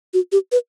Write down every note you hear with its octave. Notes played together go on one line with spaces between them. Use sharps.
F#4
G4
B4